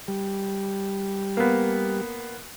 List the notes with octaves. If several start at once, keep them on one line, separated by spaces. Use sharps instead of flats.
G3
A#3 B3